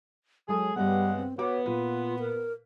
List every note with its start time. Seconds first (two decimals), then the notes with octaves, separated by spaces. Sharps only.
0.49 F#3 G#3 G#4 A4
0.76 G2 C#3 G3 G#3 B3 F#5
1.17 C4
1.38 B3 F#4 C#5 D6
1.66 A#2 F4 B4
2.19 A#4